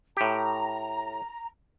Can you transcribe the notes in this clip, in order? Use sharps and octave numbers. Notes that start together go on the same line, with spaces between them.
A2 G4 A#5